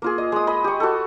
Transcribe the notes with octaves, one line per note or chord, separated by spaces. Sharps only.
A#3 F4 G#4
D#5
G#3 D#6
D#5 B5
G4 C#6
F#4 A4